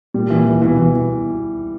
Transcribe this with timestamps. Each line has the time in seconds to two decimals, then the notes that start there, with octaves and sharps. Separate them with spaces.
0.14 A#2 G3
0.30 E3
0.46 E3
0.62 B2 E3
0.77 E3